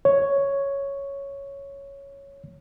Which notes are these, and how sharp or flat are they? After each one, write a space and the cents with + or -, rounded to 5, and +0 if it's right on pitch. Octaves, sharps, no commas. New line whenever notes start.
C#5 +0